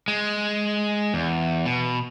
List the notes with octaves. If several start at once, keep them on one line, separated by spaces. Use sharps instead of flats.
G#3
E2
B2